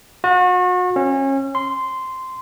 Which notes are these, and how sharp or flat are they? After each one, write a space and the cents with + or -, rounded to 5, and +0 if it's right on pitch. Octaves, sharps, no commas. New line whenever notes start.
F#4 -35
C#4 -30
C6 -10